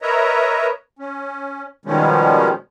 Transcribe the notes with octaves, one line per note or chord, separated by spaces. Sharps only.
A#4 B4 C#5 D#5 E5 A#5
C#4
B2 D#3 F3 G3 G#3 C#4